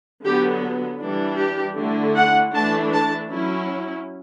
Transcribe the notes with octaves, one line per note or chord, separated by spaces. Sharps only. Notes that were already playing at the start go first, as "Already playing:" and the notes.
D3 F#3 B3 G4
E3 G3 D4
G4
D3 A3 E4
F#5
E3 A3 D4 A5
A5
F#3 C#4 E4